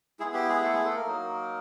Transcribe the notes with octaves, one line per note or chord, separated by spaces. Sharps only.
G#3 B3 E4 G#4
G4
G#3 G#4
A3 A4
G#3 G#4
A3 A4
A#3 A#4
F#3 A#3 D#4